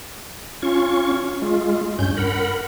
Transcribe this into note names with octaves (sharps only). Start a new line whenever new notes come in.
C#4 F4 C#6
G#3 F4
G2 C#4 G6
A#4 F#5 B5